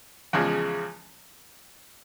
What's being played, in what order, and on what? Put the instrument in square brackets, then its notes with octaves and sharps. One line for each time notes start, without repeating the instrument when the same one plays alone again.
[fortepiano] E2 C#3 F3 G#3